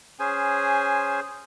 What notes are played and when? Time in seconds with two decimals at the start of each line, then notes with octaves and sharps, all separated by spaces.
0.19 C#4 G#4 C5 G#5